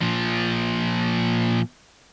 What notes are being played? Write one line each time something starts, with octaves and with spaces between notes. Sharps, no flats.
A#2 F3